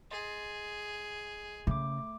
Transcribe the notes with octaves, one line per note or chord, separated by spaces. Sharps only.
G#4 D#5 C6 A6
C#3 A3 D6